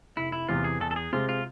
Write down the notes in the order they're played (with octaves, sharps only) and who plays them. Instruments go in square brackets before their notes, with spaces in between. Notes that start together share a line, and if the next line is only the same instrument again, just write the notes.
[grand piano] F1 [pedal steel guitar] E4
[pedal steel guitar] E4
[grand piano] E2 C3 E3 B3 [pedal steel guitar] F4
[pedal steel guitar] G#4
[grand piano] E2 [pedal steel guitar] A4
[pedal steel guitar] A4
G#4
[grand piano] C3 G#3 C4 [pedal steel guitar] F4
[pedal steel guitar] F4